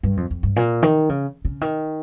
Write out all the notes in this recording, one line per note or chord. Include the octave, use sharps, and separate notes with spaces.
G2
F2
F2
G2
A#2
D#3
C#3
C#3
D#3